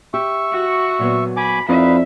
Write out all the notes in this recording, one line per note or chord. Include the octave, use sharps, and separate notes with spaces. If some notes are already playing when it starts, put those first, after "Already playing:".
G4 E5 C#6
F#4
A#2 F#3 B3
G#5 B5 D6
F2 D#4 E4 B4 D5 E5 F5